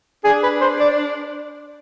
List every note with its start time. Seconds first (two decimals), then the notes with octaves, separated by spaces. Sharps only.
0.24 D4 G#4
0.43 B4
0.61 C5
0.80 D5